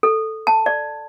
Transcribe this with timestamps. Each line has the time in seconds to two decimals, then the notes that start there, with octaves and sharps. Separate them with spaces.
0.03 A4
0.47 A5
0.66 D5